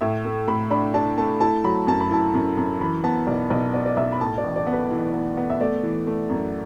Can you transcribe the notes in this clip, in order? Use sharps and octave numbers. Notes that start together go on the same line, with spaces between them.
A2 E5
A3
A2 B5
D4 B5
D4 A5
A3 A5
E4 A5
F#3 B5
F#2 A5
B5
E4 A5
F#2
F#2
E3 B5
B3 A5
B1 D5
B1 D5
B3 D5
D5
B1 E5
B5
A2 A5
D5
A1
D5
B3
B4
E3
B3
B3
E5
A3 D5
E3
A3
F#2